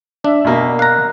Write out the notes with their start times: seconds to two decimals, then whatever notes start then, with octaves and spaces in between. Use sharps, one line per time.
0.24 D4 E5
0.45 B2 A#3
0.79 F5 A#5 F#6